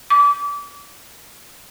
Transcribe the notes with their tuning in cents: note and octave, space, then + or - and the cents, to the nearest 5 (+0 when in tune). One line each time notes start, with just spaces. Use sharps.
D6 -30